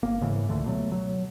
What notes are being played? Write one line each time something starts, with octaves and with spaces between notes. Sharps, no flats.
G1 A#3
G#2 C#3 E3
C#2 D3 A3
B2 F#3 A3
F#3